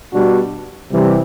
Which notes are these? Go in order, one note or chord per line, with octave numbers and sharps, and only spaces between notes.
B2 G3 D4 F#4
C3 E3 G3